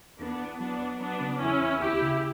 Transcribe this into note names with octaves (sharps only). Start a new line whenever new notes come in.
E2 B3 D4
E2
F#3 B3 D4
F#3
F#3 B3 D4
C#3
E2 C#4 E4
E2
D2 E4 G4
C#3